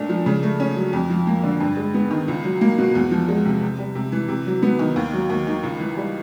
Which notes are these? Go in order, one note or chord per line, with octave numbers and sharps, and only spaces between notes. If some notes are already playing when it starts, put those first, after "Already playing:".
Already playing: A#2 A3 D4
F3
C#3
A3
C#4
F#3
F2
F3
A#3
D3
G2
G#3
B3
D#3
C#2
F#3
A#3
B2
E2
F3
G#3
C3
C3
G3
C3
E3
C3
F#3
B3
D#3
D#2
F#3
D#2
D#3
C#2
E3
G3